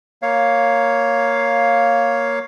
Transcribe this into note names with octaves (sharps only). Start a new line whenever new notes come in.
A#3 C#5 F5